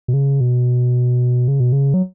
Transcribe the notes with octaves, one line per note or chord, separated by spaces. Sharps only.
B2
C#3
B2
C#3
B2
C#3
F#3